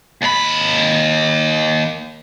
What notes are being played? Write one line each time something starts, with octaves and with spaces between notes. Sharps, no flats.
D#2 B5